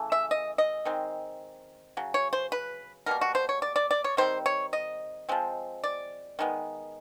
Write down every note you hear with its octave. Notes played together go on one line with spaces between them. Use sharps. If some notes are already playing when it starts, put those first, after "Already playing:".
Already playing: C#3 E3 A3
E5
D#5
D#5
D#3 G#3 C4
C#3 F#3
C#5
C5
B4
B2 G3 A#3 A#4
F#4
C5
C#5
D5
D5
D5
C#5
D#3 G3 C4 C5
C#5
D#5
F3 G#3 C4
D5
D#3 G#3 B3